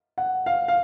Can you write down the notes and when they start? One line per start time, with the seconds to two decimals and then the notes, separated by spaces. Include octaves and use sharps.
0.18 F#5
0.46 F5
0.68 F5